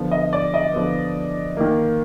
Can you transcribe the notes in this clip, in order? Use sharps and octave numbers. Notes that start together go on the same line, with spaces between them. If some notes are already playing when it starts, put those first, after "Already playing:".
Already playing: D3 F3 B3
D#5
D5
D#5
D3 F3 B3
D#3 A#3